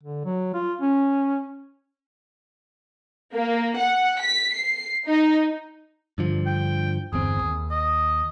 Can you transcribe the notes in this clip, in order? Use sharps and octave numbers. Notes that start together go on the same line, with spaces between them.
D3
F#3
F4
C#4
A#3
F#5
B6
C7
D#4
G2 D3 F3
G5
G1 E2 C4 G#4
D#2
D#5